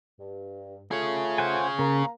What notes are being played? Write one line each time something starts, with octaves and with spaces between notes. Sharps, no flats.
G2
A3 F4 G#4 C#5
C5 F#5 G#5
C#3 A#3 A#5